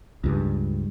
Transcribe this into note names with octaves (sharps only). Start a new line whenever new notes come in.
C#2 G2